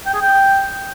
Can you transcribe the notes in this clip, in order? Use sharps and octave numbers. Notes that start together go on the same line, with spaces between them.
G5
G#4
G5